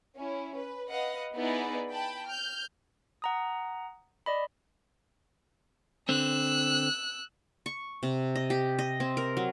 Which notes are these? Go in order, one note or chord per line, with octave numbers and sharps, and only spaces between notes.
C#4 E4
B4
B4 D#5 F5 F#5
B3 D#4 E4 G#4 B4 D5
G5 A5 B5
F6 G6
F#5 A#5 D#6
D5 D#5 B5
D3 C4 E6 F#6
C#6
C3
D#5
G4
D#5
C4
A#4
F#3